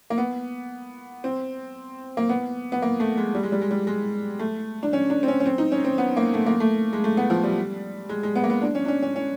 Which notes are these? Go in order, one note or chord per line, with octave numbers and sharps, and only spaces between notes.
A#3
B3
C4
A#3
B3
B3
A#3
A3
G#3
G3
G#3
G3
G#3
G3
G#3
A3
D4
C#4
D4
C4
C#4
C#4
C4
D#4
C#4
C4
B3
A#3
A3
A#3
A3
G#3
A3
B3
F3
G3
G#3
G#3
B3
A#3
B3
D4
C#4
D4
C#4
C#4
C#4